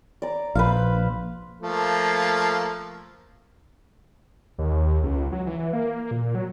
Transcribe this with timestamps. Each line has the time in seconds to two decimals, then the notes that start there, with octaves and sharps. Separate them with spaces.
0.22 D5 A#5
0.55 A#1 B4 C5 F5
1.62 F3 A3 A#3
4.58 D#2
5.03 C#2
5.32 F#3
5.47 E3
5.73 A#3
6.11 A#2
6.35 F#3